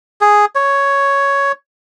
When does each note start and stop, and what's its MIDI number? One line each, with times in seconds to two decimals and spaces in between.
0.21 0.45 68
0.55 1.52 73